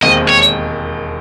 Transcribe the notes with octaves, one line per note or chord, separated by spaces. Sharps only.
E1 D#2 D#3 G#3 C4 D#5
C#5